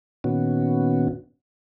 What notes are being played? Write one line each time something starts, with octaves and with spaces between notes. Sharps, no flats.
A#2 D#3 B3 C#4 F#4